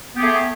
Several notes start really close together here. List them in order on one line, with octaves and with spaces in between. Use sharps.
B3 G4 G#4 A3